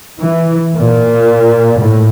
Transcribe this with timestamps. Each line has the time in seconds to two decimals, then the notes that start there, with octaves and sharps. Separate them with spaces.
0.19 E3
0.77 A#2
1.79 A2